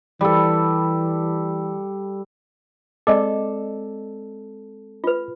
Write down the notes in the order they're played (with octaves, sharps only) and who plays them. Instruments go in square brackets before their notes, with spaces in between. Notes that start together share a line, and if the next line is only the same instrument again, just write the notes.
[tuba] E3 [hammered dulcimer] G3 A4
[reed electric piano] G#3 C4 A4 [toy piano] D5 D#5 D6
[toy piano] F4 B4